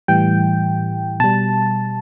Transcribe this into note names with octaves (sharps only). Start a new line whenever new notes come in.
A2 E3 G3 G5
B2 G3 A5